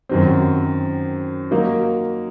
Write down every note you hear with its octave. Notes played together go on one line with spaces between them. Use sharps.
F#2 D#3 F#3 C4
F#3 A#3 D#4 A#4